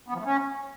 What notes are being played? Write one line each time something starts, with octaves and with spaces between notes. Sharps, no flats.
B3
F3
A3
C#4